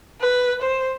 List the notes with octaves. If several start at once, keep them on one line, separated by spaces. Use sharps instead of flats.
B4
C5